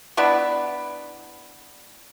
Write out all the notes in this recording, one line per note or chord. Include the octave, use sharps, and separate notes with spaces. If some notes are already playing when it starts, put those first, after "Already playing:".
B3 D4 E4 B4